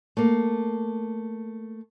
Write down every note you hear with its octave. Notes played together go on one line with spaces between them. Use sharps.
A3 A#3